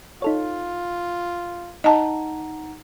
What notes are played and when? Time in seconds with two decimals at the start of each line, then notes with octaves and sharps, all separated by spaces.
0.22 D#4 F4 A4 C#5
1.84 D#4 D#5 F#5 A5 A#5